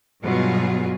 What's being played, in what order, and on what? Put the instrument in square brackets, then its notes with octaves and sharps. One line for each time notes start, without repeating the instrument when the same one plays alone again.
[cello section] G2 B2 F#3 F4 G#4